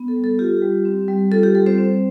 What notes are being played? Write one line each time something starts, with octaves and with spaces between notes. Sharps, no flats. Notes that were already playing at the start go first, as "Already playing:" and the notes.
Already playing: B3
A4
G3
A4
F4 G4
G3
C4
G3
F4 A4
G4
G3 A4
C4 C5
C4